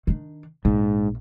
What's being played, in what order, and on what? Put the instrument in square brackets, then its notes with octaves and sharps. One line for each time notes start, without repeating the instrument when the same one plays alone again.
[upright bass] D#3 D4
[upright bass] A#1 [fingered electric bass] G#2